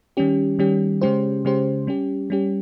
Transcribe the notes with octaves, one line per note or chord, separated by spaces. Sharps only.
D#3 G3 C#4 G4
D#3 G3 C#4 G4
C#3 G#3 C#4 G4 C5
C#3 G#3 C#4 G4 C5
G3 C#4 G4
G3 C#4 G4